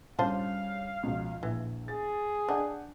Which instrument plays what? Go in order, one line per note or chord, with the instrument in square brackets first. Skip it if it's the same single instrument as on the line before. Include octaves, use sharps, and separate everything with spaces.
[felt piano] G2 C#3 G3 [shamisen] F4 C5 A5 [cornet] F5
[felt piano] C#2 B2 F3
[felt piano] A#1 [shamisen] E3
[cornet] G#4 [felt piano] A6
[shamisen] D4 [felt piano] D5 F#5 G5